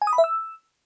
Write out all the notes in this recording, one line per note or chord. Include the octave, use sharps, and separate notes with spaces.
G#5
D#6
B5
E5
E6